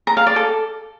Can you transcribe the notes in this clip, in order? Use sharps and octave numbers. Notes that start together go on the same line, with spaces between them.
A#5
F5
D5
A4